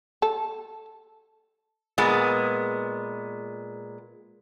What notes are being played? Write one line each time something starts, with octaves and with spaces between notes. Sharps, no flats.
A4
A#2 G#3 B3